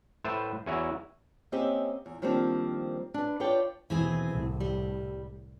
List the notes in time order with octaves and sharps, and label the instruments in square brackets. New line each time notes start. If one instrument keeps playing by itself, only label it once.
[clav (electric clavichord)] A2 B4 C5 E5 A5
E2 C#4 E4 F#4 E5 A#5
[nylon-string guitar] A#3 C4 C#4 G4 D#5 E5
E2
D#3 F3 G3 A#3 C4 D4
D4 B4
F4 B4 C#5 D5 F5 G5
[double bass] D#2 B2 [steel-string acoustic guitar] E3 C4 G#4
[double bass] C2 A2
[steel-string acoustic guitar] G3